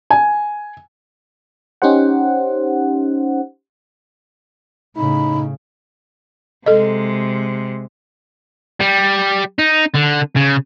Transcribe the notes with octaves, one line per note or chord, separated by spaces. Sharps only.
G#5
C#4 D#4 G4 C5 F#5
A2 C#3 D#4 B5
C3 G#3 A4 D#5
G3
D#4
D3
C#3